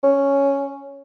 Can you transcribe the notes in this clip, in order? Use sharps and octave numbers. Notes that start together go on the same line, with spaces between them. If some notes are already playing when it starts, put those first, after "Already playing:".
C#4